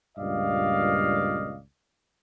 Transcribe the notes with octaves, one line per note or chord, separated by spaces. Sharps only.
C#2 G2 A#2 D5 D#5 F5